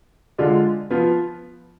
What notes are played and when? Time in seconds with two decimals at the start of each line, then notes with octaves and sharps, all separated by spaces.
0.38 D3 G#3 D4 F4
0.90 F3 B3 F4